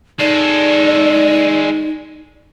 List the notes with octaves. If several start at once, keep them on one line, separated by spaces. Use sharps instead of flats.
G#3 D#4 A4 D5